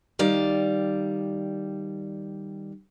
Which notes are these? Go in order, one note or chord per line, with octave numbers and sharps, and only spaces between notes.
D#3 G3 D5 F5